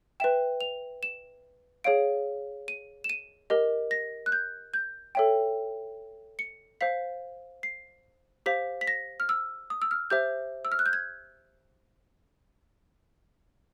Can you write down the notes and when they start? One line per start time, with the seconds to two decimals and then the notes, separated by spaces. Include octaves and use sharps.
0.20 B4 E5 G5 E7
0.61 F7
1.03 E7
1.84 G#4 C#5 F5 D7
2.68 D#7
3.04 E7
3.10 D#7
3.50 G4 A#4 D#5
3.91 A#6
4.26 F#6
4.32 G6
4.74 G6
5.15 A4 C#5 E5 G5
6.39 C#7
6.81 C5 F5 B6
7.63 C7
8.46 G4 C5 F5 B6
8.81 B6
8.87 A#6
9.20 F6
9.29 E6
9.70 D#6
9.82 E6
9.91 F6
10.10 G4 C5 E5 G6
10.65 E6
10.72 F6
10.79 F#6
10.86 G6
10.93 G#6